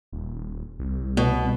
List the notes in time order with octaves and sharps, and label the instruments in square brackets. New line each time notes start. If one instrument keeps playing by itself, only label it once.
[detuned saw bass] D#1
C2
[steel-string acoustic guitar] B2